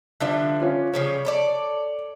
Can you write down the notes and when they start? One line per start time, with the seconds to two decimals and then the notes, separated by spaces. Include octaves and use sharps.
0.20 D3 F3 G3 D4 E5 F#6
0.62 C#4 F4
0.94 C#3 F3 G3 C#5
1.25 A4 B4 D5